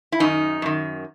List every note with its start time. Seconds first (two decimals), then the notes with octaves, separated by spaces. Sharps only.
0.12 E4
0.20 F#2 D#3 D#4
0.62 F#2 D#3